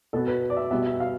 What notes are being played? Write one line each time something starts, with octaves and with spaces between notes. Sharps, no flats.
B2 B3 A4
B4
D5
E5
B2 G3 B3 E5
E5
F5